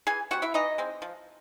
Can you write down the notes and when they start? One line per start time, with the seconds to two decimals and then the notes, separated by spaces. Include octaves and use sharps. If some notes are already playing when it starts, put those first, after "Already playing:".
0.07 E3 G#4 G#5
0.31 G3 C4 F#4 F#5
0.42 E4 E5
0.54 E3 D#4 D#5
0.78 G#3 C4
1.02 F3